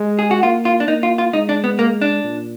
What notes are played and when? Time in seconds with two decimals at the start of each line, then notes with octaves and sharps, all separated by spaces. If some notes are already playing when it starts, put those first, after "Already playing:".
Already playing: G#3
0.19 G#4
0.31 F#4
0.43 A#3 F4
0.65 F4
0.80 D4
0.88 A#3 D#4
1.03 F4
1.18 F4
1.33 G#3 D#4
1.49 D4
1.64 B3
1.79 A#3
2.02 D4
2.24 A#2